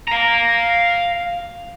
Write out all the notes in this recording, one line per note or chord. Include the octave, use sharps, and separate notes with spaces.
F5 A#5